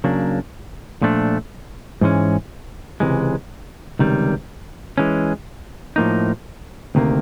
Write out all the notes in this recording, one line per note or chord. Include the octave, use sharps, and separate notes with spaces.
C#3 F#3 A#3 D4
A#2 F3 A3 D4
G#2 E3 G#3 C#4
C#2 C3 E3 G#3
C#2 C3 D#3 G3
E3 G#3 C#4
A2 F3 A#3 D#4
D2 C3 D#3 G3 A#3